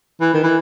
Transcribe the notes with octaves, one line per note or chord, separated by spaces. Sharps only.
E3
D#3
E3